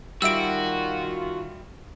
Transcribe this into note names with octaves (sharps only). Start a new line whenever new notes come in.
D#3 G3 F4 F#4 E5 E6 D7